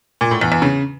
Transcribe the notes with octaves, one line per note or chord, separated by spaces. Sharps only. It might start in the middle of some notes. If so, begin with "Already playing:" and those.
A#2
A2
E2
E2
C#3